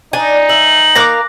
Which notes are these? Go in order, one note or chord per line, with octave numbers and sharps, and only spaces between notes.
D4 D#4 G#5
E5 F#7
A#3 A#4 F5 D6 F#6 A#6